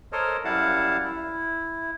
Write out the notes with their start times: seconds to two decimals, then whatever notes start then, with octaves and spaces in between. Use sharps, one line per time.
0.12 A4 A#4 C5 C#5 D#5
0.45 F#2 G3 E4 F5 F#5 A5
1.04 E4